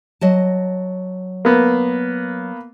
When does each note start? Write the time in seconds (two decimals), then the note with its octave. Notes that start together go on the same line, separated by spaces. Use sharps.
0.21 F#3 D#5 A5
1.45 A#3 B3